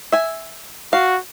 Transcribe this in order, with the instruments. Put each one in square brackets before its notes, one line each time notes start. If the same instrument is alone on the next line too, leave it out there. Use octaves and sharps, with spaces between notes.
[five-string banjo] E5 G#5
[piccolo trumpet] F#4 [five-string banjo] F5